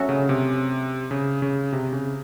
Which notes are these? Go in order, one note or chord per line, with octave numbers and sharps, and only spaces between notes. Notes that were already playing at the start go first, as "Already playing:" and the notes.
Already playing: F#3 A3 C#4 F#4 A4
C#3
C3
C#3
C#3
C3
C#3